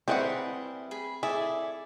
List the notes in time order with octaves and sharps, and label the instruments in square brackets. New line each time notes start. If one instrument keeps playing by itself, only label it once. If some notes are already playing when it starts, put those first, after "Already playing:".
[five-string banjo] G3 B4 F#5 [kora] C4 [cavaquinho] E4 G#4 A#4
[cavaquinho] G#4 B5
[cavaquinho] E4 A4 D5 [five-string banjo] G#4 [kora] E5